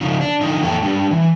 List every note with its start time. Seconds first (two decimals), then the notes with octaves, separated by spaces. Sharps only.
0.01 C#3 F3 D#4
0.21 D4
0.41 D3 F3 D#4
0.60 F2 E3 A#3 A4 G5
0.82 G3 D4
1.11 E3